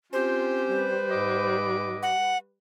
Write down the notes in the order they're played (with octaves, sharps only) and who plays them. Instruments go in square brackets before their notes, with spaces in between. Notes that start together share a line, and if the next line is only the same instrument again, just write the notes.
[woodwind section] C4 C#4 G4 [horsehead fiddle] F4 [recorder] C5
[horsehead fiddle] G3 B4
[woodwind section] G#2 D#5 D6
[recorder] F#5